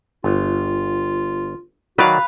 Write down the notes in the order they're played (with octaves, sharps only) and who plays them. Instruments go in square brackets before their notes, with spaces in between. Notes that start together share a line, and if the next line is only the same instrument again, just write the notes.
[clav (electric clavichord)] G1 [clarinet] F4
[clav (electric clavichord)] D#3 F#3 D5 [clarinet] F#4 [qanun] B4 F5